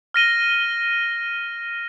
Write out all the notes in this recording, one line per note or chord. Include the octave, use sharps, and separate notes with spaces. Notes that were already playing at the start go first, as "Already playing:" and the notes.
F6 A#6 D#7 G7